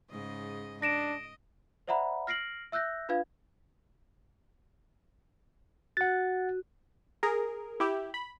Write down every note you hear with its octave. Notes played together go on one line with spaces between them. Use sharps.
G#2 C#3 D#5
D4 D#5 A#6 D7 E7
C5 D5 E5 F#5 A#5 B5
F6 A#6 C7 D7 F#7
E5 E6 F#6 G6 A#6
D4 F4 B4 F5 G#6
F#4 F#5 A6
G#4 A#4
E4 G4
B5